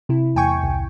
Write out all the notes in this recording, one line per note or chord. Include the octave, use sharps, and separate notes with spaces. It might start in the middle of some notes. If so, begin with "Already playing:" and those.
C3 E4
E2 A2 G5 G#5 C#6
C2